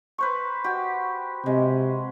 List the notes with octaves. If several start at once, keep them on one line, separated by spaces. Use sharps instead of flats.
B4 C5 C#6
F#4 G4
C3 G#3